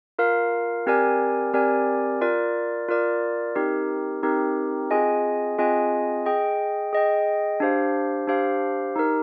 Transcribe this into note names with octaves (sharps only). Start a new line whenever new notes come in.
F4 A#4 F5
C4 G4 A#4 D5 G#5
C4 G4 A#4 D5 G#5
F4 A#4 D5
F4 A#4 D5
C4 D#4 G4 A#4
C4 D#4 G4 A#4
C4 F4 G#4 D#5 G#5
C4 F4 G#4 D#5 G#5
G#4 D#5 G5
G#4 D#5 G5
D4 G4 C5 F5
D4 G4 C5 F5
D#4 G4 A#4